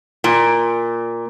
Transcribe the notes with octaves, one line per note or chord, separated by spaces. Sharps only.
A#2